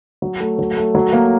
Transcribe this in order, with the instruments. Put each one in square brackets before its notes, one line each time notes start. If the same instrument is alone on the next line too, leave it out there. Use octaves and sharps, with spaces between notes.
[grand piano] F#3
A3
F#3
A3
F#3
A#3